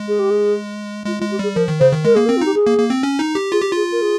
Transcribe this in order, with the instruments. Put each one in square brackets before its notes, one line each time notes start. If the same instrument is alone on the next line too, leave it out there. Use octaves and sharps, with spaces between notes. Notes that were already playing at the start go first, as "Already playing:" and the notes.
Already playing: [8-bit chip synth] G#3
[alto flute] G#4
G4
G#4
[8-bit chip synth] G#3 [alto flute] F4
[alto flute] F4
[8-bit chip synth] G#3
[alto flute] G4
[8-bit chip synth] G3 [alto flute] G#4
[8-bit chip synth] F3 [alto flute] A#4
[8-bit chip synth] D#3
[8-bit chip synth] C#3 [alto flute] C5
[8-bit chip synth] D#3
[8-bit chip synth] G#3 [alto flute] A#4
[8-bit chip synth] A#3 [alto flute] G#4
[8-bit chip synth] C4 [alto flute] A#4
[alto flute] F4
[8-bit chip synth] D#4 [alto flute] G4
[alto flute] G#4
[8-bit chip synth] A#3
A#3
C4
C#4
D#4
G4
[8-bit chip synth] F4 [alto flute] G#4
[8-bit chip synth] G4
[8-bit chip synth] F4 [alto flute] G#4
[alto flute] A#4
G#4